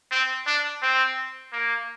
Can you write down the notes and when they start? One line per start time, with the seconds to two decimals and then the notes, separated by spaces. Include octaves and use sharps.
0.12 C4
0.46 D4
0.82 C4
1.52 A#3